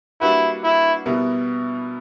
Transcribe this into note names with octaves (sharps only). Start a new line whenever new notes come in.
G3 A#3 D4 E4 F#4 B4
E4
B2 G3 B3 E4 A#4